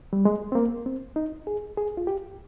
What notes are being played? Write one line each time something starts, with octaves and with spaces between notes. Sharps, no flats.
G3
G#3
C4
A#3
C4
D#4
G#4
G#4
F4
G4